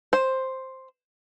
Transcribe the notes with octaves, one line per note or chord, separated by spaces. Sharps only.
C5